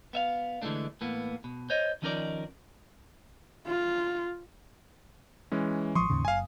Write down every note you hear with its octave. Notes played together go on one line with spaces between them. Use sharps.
B3 E5 F5
D3 E3 F#3 G#3 A3 D4
A2 E3 A#3 B3
B2
C5 C#5 D#5
D#3 F3 C#4 D#4 A#4 D5
F4
E3 G#3 C#4
A1 F3 C6 C#6 D#6
D#2 G#2 C#3
F#1 F5 G#5